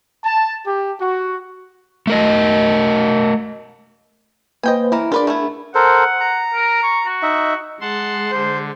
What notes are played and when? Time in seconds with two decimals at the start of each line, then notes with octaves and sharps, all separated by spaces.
0.23 A5
0.66 G4
0.98 F#4
2.07 A3 A#4 D#5
4.63 A#3 B4 C5 D#5 G5 G#5
4.92 E3 E4 A#4
5.12 D4 F4 G#4 A#4 B4 D5
5.27 A3 B3 E4
5.75 A4 A#4 C5 F#5
6.20 A#5
6.54 A#4
6.83 C#6
7.06 F#4
7.22 D#4 E5
7.81 G#3 F#5 A5 C6
8.31 D3 C5